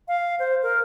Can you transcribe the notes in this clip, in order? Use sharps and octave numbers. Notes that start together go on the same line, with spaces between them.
F5
C5
A#4